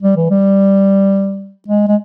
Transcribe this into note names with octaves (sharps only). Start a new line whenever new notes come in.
G3
E3
G3
G#3
G#3